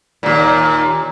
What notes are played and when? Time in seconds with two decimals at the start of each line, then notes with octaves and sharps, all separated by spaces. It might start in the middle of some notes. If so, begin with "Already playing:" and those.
0.23 D#2 A#2